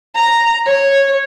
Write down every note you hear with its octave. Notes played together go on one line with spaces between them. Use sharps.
A#5
C#5